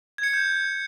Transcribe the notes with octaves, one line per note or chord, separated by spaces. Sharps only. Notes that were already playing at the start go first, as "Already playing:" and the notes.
G#6
C#7
G#6
G6